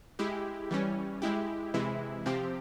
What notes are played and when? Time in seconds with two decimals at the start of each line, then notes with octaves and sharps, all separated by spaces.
0.19 G#3 E4 G4
0.71 E3 G3 C#4
1.22 G#3 E4 G4
1.74 C3 E3 G#3 E4
2.26 C3 F3 C4 G4